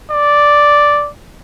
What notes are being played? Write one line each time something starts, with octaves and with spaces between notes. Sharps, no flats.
D5